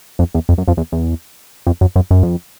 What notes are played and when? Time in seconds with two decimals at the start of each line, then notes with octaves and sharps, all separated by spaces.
0.19 F2
0.34 E2
0.49 F2
0.58 F#2
0.68 F2
0.77 E2
0.92 E2
1.67 F2
1.81 F#2
1.96 F#2
2.11 F#2
2.23 F2